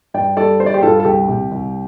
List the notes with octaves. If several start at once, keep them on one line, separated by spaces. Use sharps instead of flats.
G2 D5 G5
G3 A4 D5
G3 C5
D5
G4 C5
G2 F4 A4
A4
C2 G4
C3
C2